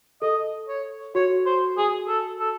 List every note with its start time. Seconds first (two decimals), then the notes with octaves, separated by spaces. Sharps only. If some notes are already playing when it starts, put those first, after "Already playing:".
0.22 A4 D#5
0.68 C#5
1.15 F#4 C#5
1.46 C5
1.78 G#4
2.08 A4
2.40 A4